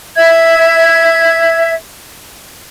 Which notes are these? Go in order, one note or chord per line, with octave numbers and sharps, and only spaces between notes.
E5 G#6